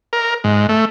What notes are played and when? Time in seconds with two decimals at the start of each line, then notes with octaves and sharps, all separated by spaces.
0.13 A#4
0.44 G#2
0.69 A3